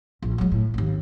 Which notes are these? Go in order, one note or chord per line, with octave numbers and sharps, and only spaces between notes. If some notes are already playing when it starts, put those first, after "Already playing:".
A#1
F#3 G#3
A2
G#1 D#2